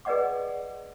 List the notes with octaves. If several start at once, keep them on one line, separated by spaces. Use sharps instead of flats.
G#4 B4 D5 D#5 F#5 D6